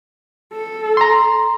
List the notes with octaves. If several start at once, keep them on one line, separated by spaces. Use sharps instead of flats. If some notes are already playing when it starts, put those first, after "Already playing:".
A4
A#5 C6